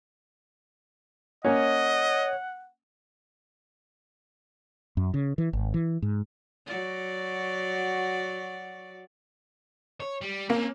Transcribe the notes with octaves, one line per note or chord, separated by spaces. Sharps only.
A#3 C#4 C#5 D#5 F#5
F#2
C#3
E3
G#1
E3
G#2
F#3 F#4 D5
C#5
G3
A#3 C4 C#4